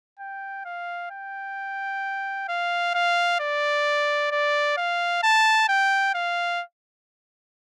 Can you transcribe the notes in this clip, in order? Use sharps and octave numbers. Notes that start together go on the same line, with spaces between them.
G5
F5
G5
F5
F5
D5
D5
F5
A5
G5
F5